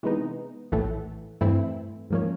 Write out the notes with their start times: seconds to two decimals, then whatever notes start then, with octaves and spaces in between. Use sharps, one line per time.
0.03 C3 E3 G#3 B3 D#4
0.72 A#1 A2 E3 A3
1.41 G2 E3 A3 C4 E4
2.10 G#2 F3 A#3 C#4